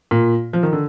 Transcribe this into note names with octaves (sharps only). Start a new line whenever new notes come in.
A#2
F3
D#3
D3